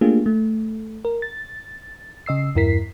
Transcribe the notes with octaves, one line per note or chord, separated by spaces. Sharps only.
A3 A#3 D4 F4 G4 G#4
A3
A#4
A6
C#3 D#5 E6 C7
E2 G2 E4 A#4 B6 C7